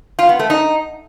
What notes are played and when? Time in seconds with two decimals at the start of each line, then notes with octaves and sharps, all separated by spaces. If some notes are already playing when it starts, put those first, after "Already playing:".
0.19 F4
0.29 B3
0.39 A3
0.50 D#4